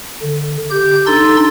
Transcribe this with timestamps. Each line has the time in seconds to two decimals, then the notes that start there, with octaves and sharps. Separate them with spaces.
0.23 D3
0.70 G4 G6
1.06 D4 D#4 A4 C6 E6 A6